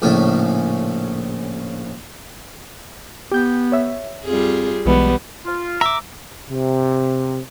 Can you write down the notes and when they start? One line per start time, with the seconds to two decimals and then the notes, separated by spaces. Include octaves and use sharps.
0.02 A#1 A2 C#3 C#4 A4 E5
3.32 B3 G4 G6
3.72 C#5 E5
4.25 F2 G3 F4 G#4
4.86 B1 E3 G3 G#3 B3
5.45 F4
5.81 E5 A#5 D6
6.50 C3